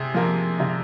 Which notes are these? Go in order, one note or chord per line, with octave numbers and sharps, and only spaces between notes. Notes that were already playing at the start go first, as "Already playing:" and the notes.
Already playing: C3 G#4
F3 A#3
C3